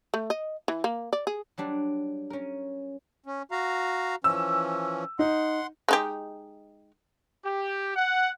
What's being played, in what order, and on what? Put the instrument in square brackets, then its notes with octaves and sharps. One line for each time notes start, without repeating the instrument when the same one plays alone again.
[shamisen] A3
D#5
E3
A#3
D5
G#4
[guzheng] F#3 G3 D4
C#4 A#4
[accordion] C#4
F#4 F5 A#5
[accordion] E3 F3 C#4 [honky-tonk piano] E6
[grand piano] D#4 [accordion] F#5 C6
[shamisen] G#3 D#4 G4
[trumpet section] G4
F#5